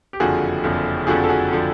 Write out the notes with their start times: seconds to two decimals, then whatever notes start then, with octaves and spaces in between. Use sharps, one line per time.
0.13 G4
0.20 F#1 F2 D3 F3 F#4 G#4
0.64 F#1 F2 D3 F3
1.07 F#1 F2 D3 F3 F#4 G#4
1.24 A4
1.29 F#4 G#4
1.53 D3 F3